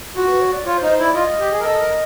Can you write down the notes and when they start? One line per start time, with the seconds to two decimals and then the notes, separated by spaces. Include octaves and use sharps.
0.16 F4 F#4
0.28 B4
0.41 C#5
0.53 D5
0.66 F4 C#5
0.78 C5
0.82 D#4
0.90 C5
0.99 E4 D5
1.15 F4 D#5
1.40 G4
1.52 G#4
1.60 A#4
1.64 A4 D#5
1.80 A#4